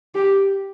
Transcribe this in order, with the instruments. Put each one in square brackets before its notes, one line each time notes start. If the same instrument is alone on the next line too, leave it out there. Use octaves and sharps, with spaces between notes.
[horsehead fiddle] G4